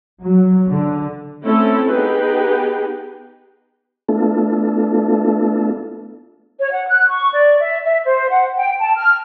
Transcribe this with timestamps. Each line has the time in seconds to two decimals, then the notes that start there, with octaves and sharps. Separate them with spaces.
0.24 F#3
0.69 D3
1.43 A3 C4 C#4 E4 A4
1.91 B3 D#4 G4 G#4 B4 G5
4.09 A3 B3 D4 E4 F4 A4
6.59 C#5
6.71 F#5
6.86 F#6
7.07 C#6
7.33 D5
7.58 E5
7.83 E5
8.04 C5
8.29 F#5
8.56 G5
8.79 A5
8.95 F6